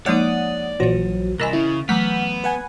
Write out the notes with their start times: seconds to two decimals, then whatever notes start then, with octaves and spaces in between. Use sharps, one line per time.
0.06 F3 G#3 A#3 D#4 C#5 D5 F#5 D#6
0.80 A#1 E3 F#3 F4 C5
1.40 C2 A#4 D#5 G#5 A#5 B5 E6 A6
1.53 C#3 E4
1.89 E3 F#3 A3 B3 F#5 F6 B6
2.44 B4 F#5 G#5